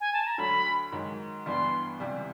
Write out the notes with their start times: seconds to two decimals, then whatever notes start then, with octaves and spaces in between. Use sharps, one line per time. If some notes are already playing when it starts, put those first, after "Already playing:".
0.01 G#5
0.13 A5
0.26 A#5
0.38 D2 D3 F#3 B5
0.92 G#2 D#3 F#3
1.46 G2 E3 G3 B3 D4 C6
2.00 C#2 C3 E3 G3